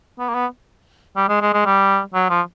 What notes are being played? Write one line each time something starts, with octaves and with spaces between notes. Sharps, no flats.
B3
A#3
B3
G3
G#3
G#3
G#3
G3
F#3
F3